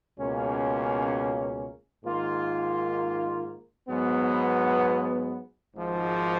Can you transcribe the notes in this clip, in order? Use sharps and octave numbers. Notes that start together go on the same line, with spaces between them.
C#2 B2 A#3 C#4
G#2 D#3 A#3 F4
G#2 F#3 B3
G#1 G#2 F3